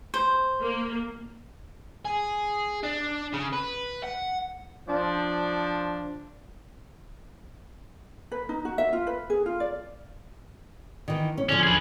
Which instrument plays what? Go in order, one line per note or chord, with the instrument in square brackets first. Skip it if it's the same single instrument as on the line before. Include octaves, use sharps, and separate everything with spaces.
[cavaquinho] C5
[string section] A#3
[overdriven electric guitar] G#4
D4
C#3
B4
F#5
[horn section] F3 D4
[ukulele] B4
D#4
F#4
E5
F4
B4
G#4
F4
D5
[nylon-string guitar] D#3 E3
C#4
[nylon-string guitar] D3 F3 [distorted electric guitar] C#4
[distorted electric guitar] G#4 B4